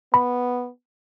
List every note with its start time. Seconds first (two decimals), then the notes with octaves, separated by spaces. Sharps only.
0.14 B3 B5